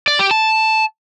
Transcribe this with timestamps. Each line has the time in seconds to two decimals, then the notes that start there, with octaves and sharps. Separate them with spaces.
0.08 D5
0.19 G4
0.31 A5